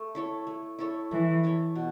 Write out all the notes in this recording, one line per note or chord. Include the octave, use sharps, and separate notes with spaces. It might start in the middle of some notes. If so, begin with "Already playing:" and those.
Already playing: A3
E4 A4 C#5
A3
E4 A4 C#5
E3 A3
E4 A4 C#5
B2